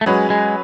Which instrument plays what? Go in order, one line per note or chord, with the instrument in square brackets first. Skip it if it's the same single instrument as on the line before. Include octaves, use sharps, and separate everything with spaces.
[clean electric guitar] A3
[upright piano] F#3 C#4 G#4 B4 [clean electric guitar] G#3
[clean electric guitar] G#3